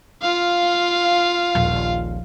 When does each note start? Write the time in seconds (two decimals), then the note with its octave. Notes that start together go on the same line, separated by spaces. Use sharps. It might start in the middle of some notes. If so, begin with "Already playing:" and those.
0.21 F4 F5
1.55 D#1 A#1